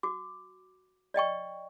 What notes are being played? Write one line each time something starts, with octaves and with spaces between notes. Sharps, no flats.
F#4 D6
D5 D#5 G5 C#6